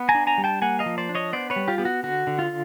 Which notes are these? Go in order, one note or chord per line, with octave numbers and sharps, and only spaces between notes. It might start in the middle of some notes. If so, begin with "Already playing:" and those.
Already playing: B3
G#5 A#5
D4
G#5 A#5
G3
G5 A5
A#3 F#5 G#5
D#5 F5
F3
C5 D5
D4
C#5 D#5
B3 C5 D5
B4 C#5
G3
F4 G4
B3 G4
F#4
D3 F#4
D3
F4